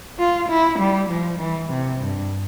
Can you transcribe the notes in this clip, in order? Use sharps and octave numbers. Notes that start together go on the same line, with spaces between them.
F4
E4
G3
F3
E3
C3
G2